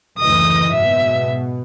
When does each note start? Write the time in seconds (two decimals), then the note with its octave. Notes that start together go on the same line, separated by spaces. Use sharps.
0.19 F#1 D2 E3 D#5 D#6
0.72 G#2 B2 E5